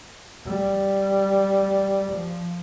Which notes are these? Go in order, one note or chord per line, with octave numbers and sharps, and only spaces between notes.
G3
F3